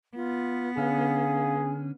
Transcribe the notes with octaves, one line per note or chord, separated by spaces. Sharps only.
B3 F4
D3 C#4 G#4 F5